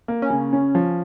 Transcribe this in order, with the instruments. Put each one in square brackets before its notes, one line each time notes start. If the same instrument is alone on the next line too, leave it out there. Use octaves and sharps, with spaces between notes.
[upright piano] A#3
[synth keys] C#4
[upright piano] C#3
C#4
F3